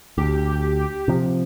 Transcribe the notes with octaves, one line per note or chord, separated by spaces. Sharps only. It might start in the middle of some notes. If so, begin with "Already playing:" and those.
D2 G4
C3 F3